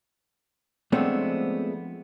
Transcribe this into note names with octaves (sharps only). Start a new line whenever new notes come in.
F3 G#3 A3 B3 C4 D4